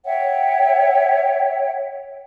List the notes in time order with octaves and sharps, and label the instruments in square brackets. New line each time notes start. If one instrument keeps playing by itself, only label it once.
[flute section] C#5 E5 F#5 G5